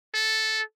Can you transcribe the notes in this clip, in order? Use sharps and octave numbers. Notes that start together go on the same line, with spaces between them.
A4